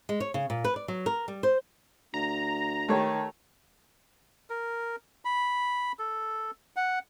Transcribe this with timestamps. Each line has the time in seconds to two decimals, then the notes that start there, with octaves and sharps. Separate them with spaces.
0.09 G#3
0.20 C#5
0.34 C#3
0.50 A#2
0.64 B4
0.76 D5
0.88 F#3
1.06 A#4
1.28 G3
1.43 C5
2.14 D2 A#5
2.88 D#3 A3 G4 C#5
4.50 A#4
5.25 B5
5.99 A4
6.76 F#5